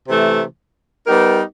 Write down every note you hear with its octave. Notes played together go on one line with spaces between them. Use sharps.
C3 E3 A3
G3 B3 D#4 G4 A#4